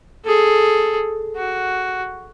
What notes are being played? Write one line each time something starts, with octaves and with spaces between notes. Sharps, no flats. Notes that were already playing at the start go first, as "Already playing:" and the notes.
G#4 A4
F#4